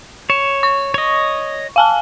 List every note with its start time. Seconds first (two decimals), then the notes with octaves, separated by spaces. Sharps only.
0.30 C#5 E7
0.63 C#6
0.94 C#5 D#5
1.76 F5 G#5 A5